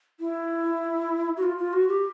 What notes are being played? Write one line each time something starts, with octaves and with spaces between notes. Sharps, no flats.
E4
F#4
F4
F4
F#4
G4